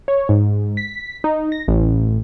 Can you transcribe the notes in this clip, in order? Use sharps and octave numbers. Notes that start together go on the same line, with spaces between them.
C#5
G#2
B6
D#4
A#6
A1